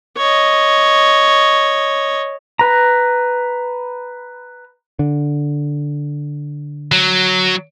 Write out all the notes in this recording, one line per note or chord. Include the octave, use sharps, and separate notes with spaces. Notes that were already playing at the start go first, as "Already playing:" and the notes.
C#5 D#5
B4 A#5
D3
F#3